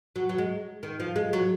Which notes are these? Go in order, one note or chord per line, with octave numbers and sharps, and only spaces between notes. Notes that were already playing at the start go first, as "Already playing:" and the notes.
F#3
F#3
G#3
D#3
F3
G#3
F#3